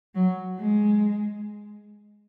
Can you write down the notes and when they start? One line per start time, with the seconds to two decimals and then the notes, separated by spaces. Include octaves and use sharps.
0.15 F#3
0.59 G#3